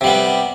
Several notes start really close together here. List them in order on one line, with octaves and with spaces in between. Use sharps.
C3 G3 B3